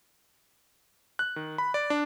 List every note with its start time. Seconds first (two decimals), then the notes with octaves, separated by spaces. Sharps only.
1.19 F#6
1.36 D#3
1.58 B5
1.74 D5
1.90 D4